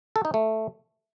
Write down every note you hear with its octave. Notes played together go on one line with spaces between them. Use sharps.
A4
D#4
A3